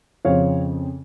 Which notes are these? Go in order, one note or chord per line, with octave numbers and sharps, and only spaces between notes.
F2 C#3 F3 C4 C#5 F5